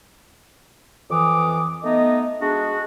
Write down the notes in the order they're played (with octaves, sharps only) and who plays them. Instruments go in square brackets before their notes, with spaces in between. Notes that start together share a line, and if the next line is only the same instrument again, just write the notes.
[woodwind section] F2 E3 D6 D#6
A3 B3 D#4 D#5
G#3 D4 F#4 G#4